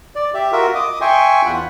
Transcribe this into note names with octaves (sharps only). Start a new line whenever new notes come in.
D5
G4 E5
F4 F#4 A#4 E5
D#5 D6 D#6
E5 G5 G#5 C6 C#6
E2 F4 F#5 B5